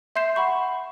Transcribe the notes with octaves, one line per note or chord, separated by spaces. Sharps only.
E5 C6 G6 C7 E7
F#5 B5 C#6